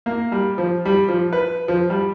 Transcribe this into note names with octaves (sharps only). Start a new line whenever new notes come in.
A#3
G3
F3
G3
F3
B4
F3
G3